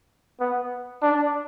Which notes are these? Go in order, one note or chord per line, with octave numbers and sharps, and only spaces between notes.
B3
D4